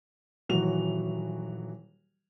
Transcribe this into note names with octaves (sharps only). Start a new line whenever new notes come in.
D#1 E3 F#3 F#4 F7